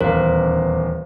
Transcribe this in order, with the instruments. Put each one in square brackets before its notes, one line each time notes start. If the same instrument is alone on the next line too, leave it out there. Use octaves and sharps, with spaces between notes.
[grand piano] D#1 E2 F5 [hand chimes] A#4 C5